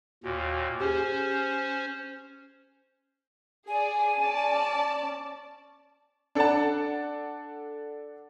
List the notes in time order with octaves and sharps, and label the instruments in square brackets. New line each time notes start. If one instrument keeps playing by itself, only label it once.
[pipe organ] D#2 A#2 [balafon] F#4
[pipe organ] C#4 C5 [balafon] G4 G#4
[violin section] G#4 D5 [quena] G#5
[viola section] C#4 D5 [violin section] A5
[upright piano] D4 A4 D5 F#5 A5